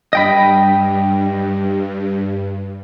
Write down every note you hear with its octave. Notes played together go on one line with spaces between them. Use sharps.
G2 D#5 G5 B5